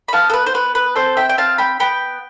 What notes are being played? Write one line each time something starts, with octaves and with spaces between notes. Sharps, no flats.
B5
B3 F5 A5
A4
B4
C5
B3 B4
B4
C4 A4 C5
E5 G5
G5
C4 F5 A5
G5 B5
B3 G5 B5